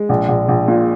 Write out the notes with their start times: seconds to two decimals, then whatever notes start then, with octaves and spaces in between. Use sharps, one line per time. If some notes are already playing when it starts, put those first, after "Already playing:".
Already playing: G#3
0.09 A#1
0.28 A#1
0.48 A#1
0.68 A#2